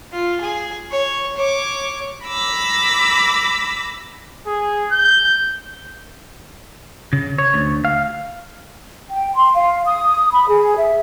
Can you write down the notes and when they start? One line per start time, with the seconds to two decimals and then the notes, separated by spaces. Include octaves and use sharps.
0.13 F4
0.41 G#4
0.91 C#5
1.37 C#5 D6
2.26 A#5 B5 D6 E6
4.47 G#4
4.92 G6
7.13 C#3
7.38 C#5
7.54 D2
7.85 F5
9.10 G5
9.35 C6
9.54 F5
9.86 D#6
10.31 B5
10.48 G#4
10.77 E5